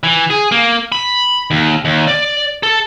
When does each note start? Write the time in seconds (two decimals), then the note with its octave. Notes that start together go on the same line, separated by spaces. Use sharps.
0.03 E3
0.30 G#4
0.52 A#3
0.92 B5
1.51 D#2
1.85 D#2
2.07 D5
2.63 A4